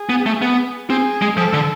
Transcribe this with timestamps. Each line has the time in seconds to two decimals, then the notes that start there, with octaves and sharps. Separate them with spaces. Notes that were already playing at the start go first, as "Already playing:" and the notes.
Already playing: G#4
0.09 B3
0.26 A3
0.42 B3
0.89 C4 G#4
1.22 G#3
1.37 F3 A4
1.53 D3